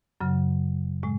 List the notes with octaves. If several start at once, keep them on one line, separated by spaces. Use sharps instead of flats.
F#2 C#3 F#3
A2 G#3